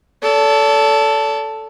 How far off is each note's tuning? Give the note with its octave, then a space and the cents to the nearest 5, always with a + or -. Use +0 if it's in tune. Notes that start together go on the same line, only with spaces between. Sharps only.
A4 +0 D5 -45